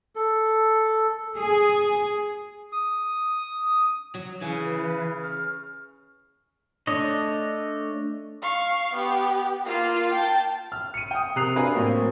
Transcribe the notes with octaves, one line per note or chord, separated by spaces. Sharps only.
A4
G#4
D#6
F#3
C#3 E3
B4
F6
A3 D4 C#5 D#5
F5 C#6
B3 G4
A#3 F4
G5 A5
F6
C#7 D#7
G5 D#6
C3 A#4 D#6 F#6 C7 F7
D4 F#4 A#4 B4 F5 G#5
A2 F#3 A#3 C4